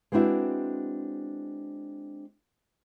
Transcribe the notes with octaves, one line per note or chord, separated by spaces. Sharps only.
G#3 B3 C4 D4 E4 F#4